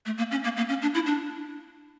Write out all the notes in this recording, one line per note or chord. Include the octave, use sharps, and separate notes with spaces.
A3
A#3
C#4
A#3
A#3
C#4
D4
E4
D4